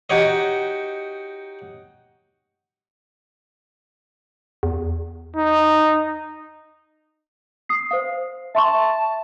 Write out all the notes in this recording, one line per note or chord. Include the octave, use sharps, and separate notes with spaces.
D#4 F#4 G4 C#5 D#5
E2
D#4
D#6 C7
C5 F5
E5 A5 C6 C#6